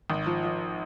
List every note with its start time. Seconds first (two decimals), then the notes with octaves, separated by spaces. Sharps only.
0.10 G#1
0.26 F3
0.44 F3